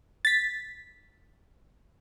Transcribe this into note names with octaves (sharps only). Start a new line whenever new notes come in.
A6 B6